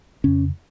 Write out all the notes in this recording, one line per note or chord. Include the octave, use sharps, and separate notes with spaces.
F2 C#3 C#4